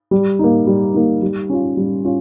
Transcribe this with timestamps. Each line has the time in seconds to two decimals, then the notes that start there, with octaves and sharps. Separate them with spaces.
0.11 G3
0.39 A#3 D#4
0.67 G3
0.94 A#3 D#4
1.22 G3
1.50 C#4 F4
1.77 G3
2.05 C#4 F4